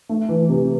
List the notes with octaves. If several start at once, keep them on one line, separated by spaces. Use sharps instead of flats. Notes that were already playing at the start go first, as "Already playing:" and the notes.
A3
E3
C3